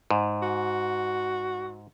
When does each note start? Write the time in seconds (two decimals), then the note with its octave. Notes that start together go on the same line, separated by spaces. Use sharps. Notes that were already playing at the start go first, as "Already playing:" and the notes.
0.11 G#2
0.42 F#4